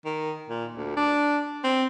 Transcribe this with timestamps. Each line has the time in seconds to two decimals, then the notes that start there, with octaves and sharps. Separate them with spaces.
0.05 D#3
0.49 A#2
0.76 D2
0.97 D4
1.64 C4